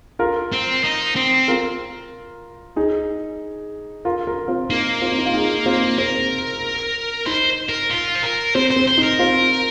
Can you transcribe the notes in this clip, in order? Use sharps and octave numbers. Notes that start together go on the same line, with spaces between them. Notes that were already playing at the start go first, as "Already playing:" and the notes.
F4 A#4
C4
D#4
C4
F4 A#4
D#4 G#4
F4 A#4
F4 A#4
C4 F4
A#3 D#4
C4 F4
C4
D#4
F4
D#4 G#4
C4 F4
C4 A#4
D#4 C5
A#4
F4
C5
A#4
C4 C5
C5
C4
C5
D#4
A#4
C4 F4